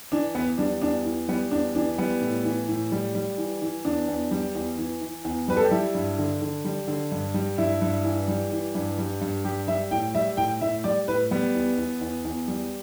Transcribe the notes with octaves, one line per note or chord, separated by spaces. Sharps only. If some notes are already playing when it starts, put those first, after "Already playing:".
E3 D4
E2 B3
G3 D4
E2 D4
E3
G3 B3
E2 D4
E3 D4
G3 B3
A2
E3
A2
G3
G3
E3
E3
E2 D4
E2
G3
E2
E3
E3
E2
G3 B4
A4
G4
G3 E4
G2
D3
D3
G3
D3
G2
G3
G2 E4
G2
E3
G3
E3
G2
G3
G2
G3 G4
G3 E5
A2 G5
G3 E5
A2 G5
A2 E5
G3 D5
A2 B4
G3 B3
E2
E2
E2
E2
G3